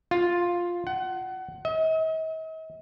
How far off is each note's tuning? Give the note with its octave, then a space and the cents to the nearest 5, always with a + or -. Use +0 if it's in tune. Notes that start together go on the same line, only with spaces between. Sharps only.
F4 +5
F#5 +25
D#5 +45